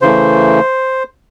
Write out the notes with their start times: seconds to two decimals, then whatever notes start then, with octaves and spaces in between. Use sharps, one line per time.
0.02 C#3 E3 A3 C5